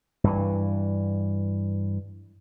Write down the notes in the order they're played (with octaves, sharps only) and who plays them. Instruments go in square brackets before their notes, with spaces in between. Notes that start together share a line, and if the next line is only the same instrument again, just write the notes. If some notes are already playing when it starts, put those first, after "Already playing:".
[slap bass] G2 E3